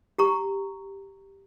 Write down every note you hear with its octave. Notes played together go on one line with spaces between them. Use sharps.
G4 A#5 C#6